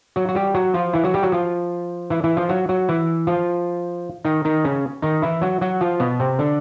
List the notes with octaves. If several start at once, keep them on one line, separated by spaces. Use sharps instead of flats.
F#3 F#4
F#4
G3 G4
F#3 F#4
F3 F4
E3 E4
F#3 F#4
G3 G4
F#3 F#4
F3 F4
E3 E4
E3 E4
F3 F4
F#3 F#4
F#3 F#4
E3 E4
F3 F4
D#3 D#4
D#3 D#4
C#3 C#4
D#3 D#4
E3 E4
F#3 F#4
F#3 F#4
F3 F4
B2 B3
C3 C4
D3 D4